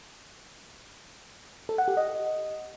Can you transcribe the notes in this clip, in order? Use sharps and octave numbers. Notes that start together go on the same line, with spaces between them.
A4
F#5
G4
D#5